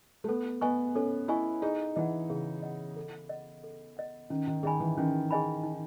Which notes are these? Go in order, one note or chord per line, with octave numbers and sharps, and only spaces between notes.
A3
B3 A4
B3 D#5 G#5 C#6
C#4 A4
E4 D#5 G#5 C#6
D#4 G#4
E3 D#5 F#5
C#3 G#4
D#5 F#5
A4
D#5 F#5
A4
D#5 F#5
D#3 C#4
D#3
D#3 G#4 D#5 G#5 B5
E3
D#3 C#4
G#4 D#5 G#5 B5
D#4